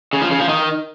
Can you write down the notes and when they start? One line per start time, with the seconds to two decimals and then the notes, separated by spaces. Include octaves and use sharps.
0.13 C#3
0.22 F3
0.31 C#3
0.40 F3
0.49 D#3